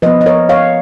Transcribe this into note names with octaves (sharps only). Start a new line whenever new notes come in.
F3 B3 B4 D#5
D#5
A#4 C#5
C#5 F5